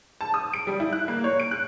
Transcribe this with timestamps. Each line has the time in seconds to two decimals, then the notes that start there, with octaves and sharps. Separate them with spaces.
0.21 A5
0.34 D#6
0.54 D7
0.67 G3
0.80 E4
0.93 F#6
1.08 A#3
1.24 C#5
1.40 D7
1.51 F#6